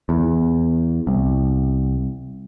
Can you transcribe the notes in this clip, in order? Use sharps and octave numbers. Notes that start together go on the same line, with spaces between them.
E2
C2